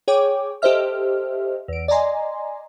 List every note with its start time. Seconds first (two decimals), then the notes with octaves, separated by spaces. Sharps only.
0.08 G#4 C#5 G5 D6
0.62 G4 A4 C5 D#5 E5 F6
1.68 E2 D7
1.88 D5 D#5 G#5 A#5 C6